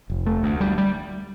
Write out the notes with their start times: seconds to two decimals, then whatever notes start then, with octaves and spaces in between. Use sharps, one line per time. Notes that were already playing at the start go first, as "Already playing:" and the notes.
0.10 F1
0.27 A3
0.43 D2
0.61 G3
0.78 G3